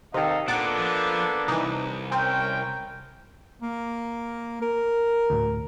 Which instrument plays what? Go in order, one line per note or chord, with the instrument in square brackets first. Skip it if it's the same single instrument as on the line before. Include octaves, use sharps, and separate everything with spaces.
[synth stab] C3 D#3 [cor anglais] D#4 [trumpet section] A4 D#5 F5
[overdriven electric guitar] A#2 [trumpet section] A#3 B3 A4 [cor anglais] D4 [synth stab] F#5 A5 D6
[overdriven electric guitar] F3
[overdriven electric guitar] C2 [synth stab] E3 D#4
[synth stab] C4 [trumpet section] C#4 G5 [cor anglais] A#4
[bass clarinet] A#3
A#4
[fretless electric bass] D2 A2